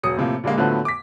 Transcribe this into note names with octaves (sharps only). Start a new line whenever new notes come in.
E1 F#3 D#6 C#7
A2 C3 F3 A#3
A#2 D3 G3 G#3 A#3
A2 D3 F3 F#3 A3 B3
D6 B6